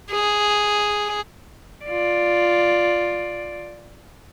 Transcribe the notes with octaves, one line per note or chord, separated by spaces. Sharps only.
G#4
F4 D5